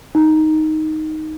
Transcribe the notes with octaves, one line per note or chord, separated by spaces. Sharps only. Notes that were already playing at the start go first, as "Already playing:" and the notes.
D#4